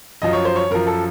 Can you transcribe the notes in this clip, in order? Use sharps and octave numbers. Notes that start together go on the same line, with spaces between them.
F#2 F3 D#5
C#5
C5
C#5
F#2 F3 A#4
A4